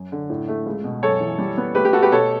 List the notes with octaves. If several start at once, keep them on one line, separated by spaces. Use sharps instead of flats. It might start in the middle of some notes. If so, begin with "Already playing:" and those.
Already playing: F#2
D3
A2
A3
C#2
B2
F#2 A4 C#5
E3
G3
B3
A3 G4 B4
G4
A3 F#4 A4
G4 B4
B2 A4 C#5